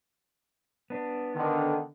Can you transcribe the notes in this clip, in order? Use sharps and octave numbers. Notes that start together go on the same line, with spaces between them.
B3 D4
D3 D#3